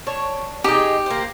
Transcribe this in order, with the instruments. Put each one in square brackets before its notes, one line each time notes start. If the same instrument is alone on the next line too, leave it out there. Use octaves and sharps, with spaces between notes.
[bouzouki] D4 C#5
[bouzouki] G#3 D#4 [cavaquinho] G4
[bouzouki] A#3 C5